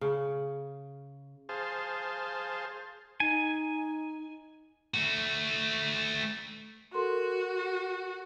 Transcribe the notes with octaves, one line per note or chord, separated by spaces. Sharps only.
C#3
G#4 C5 F5 A5
D#4 G#5
A3 F#4
F#4 A4 A#4 C6